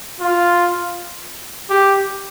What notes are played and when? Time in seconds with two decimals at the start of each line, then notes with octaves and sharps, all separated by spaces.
0.21 F4
1.70 G4